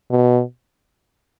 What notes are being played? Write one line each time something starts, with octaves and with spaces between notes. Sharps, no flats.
B2